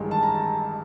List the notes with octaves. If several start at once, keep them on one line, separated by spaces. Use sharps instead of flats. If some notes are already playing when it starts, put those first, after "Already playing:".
Already playing: A1 G2 D#3 G#3
A5
A#5
A5